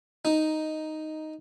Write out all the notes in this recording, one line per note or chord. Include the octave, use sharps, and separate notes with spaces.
D#4